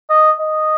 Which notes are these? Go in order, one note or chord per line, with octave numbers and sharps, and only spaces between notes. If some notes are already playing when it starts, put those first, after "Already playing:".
D#5
D#5